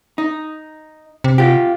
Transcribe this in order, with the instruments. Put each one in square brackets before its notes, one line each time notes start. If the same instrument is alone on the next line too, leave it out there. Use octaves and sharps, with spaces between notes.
[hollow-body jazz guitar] D#4
[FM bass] C3
[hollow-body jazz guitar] F4 G4